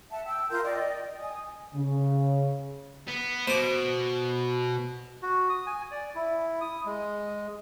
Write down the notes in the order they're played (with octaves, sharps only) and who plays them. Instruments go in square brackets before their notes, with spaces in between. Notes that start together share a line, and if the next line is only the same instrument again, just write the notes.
[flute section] E5 F#5 A5
G5 E6
F4 A#4 C6 G6
D5 D#5 G5
G#5 D#6
[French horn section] C#3
[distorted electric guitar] B3
[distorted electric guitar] B2 [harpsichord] C5 D6
[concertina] F#4
D#6
G#5
D5
E4
D#6
G#3